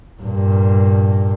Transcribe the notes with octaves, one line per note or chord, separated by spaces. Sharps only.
G2 A#2